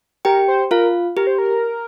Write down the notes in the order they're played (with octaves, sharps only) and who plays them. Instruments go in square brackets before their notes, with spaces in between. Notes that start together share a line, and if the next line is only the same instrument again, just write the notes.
[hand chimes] G4 G5 [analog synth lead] A#4
[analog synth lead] C5
[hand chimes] F4 F5 [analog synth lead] A#4
[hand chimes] G4 [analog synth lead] A#4
[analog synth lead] C5
A#4